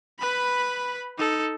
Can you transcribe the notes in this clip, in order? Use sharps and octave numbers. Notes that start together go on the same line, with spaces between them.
B4 B5
D#4 A4